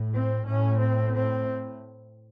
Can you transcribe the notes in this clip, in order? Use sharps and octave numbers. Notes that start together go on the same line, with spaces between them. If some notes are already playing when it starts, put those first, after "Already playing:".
Already playing: A2
C4
A2 C#4
C4
C4